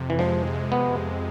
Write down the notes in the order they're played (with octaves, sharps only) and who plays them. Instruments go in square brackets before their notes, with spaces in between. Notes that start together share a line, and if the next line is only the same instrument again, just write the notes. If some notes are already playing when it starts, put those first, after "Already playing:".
Already playing: [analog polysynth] F2 C3
[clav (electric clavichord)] E3
[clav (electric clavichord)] F3 [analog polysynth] G#3
[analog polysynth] F2
[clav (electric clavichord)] B3